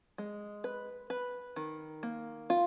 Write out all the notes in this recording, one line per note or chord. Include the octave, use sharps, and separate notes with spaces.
G#3
B4
B4
D#3
A#3
F4